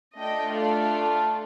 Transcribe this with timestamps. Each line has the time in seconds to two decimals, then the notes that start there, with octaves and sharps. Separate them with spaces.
0.18 A3 D4 F4 A4 D#5 G5
0.53 D5 F5